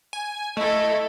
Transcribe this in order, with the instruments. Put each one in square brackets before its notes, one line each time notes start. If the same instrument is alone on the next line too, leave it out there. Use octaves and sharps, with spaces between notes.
[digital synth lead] G#5
[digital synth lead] A3 [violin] E4 A4 [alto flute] D#5